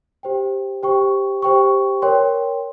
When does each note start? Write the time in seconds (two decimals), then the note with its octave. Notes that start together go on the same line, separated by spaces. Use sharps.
0.23 G4 C5 G5
0.83 G4 C5 G5 C#6
1.42 G4 C5 G5 C#6
2.02 A#4 C#5 G5 C6